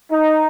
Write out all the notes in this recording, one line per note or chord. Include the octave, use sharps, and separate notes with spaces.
D#4